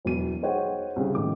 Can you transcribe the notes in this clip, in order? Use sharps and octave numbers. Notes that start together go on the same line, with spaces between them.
E1 E3 F#3 B3 D#7
D#4 G#4 C5 C#5 F#5 G5
C2 C#3
A#1 A2 D#3 D6